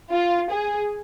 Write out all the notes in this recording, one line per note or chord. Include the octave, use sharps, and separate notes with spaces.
F4
G#4